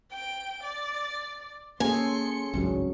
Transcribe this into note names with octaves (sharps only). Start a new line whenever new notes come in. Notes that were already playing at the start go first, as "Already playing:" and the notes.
G5 D7
D5
A#3 C#4 G#4 A4 G#5 C6 C#7
G#1 C#2 G2 F#3 C#4 G#4